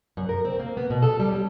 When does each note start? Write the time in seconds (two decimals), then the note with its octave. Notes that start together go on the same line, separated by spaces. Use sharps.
0.17 F#2
0.29 A#4
0.45 C4
0.60 A#3
0.77 B3
0.90 B2
1.02 A4
1.20 G3
1.32 C#4